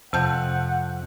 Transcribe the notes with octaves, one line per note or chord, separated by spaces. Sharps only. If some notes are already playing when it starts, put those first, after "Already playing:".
F2 C3 F#5 A5 G6